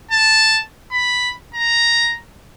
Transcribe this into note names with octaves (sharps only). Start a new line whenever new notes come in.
A5
B5
A#5